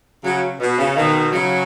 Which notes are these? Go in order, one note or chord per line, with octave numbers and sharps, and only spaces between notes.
C#3 F#3
B2
C#3
B2 D#3
C#3 F#3